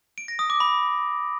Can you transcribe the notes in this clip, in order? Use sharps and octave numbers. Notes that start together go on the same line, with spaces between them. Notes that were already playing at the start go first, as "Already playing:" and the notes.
D7
A#6
D#6
D6
B5